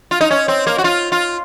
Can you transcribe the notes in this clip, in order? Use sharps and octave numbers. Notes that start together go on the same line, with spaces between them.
F4
D#4
C#4
C4
A#3
F#4
F4
F4